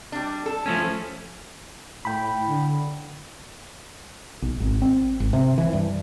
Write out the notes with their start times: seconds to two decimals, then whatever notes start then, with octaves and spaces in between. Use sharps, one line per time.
0.12 G3 D4
0.46 A4
0.66 F3 A3 C#4
2.05 A2 G5 B5
2.48 D3
4.42 B1
4.60 G#1
4.82 C4
5.20 G#1
5.33 C3
5.58 E3
5.73 G2